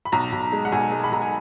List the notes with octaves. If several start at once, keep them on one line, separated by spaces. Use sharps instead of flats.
B5
B1 A#5
B1
G#3
F#5
B1 G#5
G#3
B5
B1 A#5
G#5